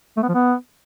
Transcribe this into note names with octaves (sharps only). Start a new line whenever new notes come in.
A3
B3
F3
B3